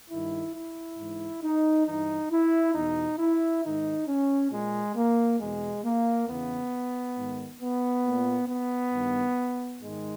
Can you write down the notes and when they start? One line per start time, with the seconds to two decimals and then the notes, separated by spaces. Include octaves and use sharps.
0.10 G2 D#3 E4
0.55 E4
0.98 G#2 E3
1.43 D#4
1.86 G2 E3 D#4
2.31 E4
2.75 E2 B2 D#4
3.19 E4
3.64 G#2 D#3 D#4
4.08 C#4
4.51 A#2 G#3
4.96 A#3
5.39 E2 B2 G#3
5.83 A#3
6.28 E2 C#3 E3 B3
7.16 G#2 D#3
7.61 B3
8.05 A#2
8.48 B3
8.92 G2 D#3
9.81 G#2 D#3 G#3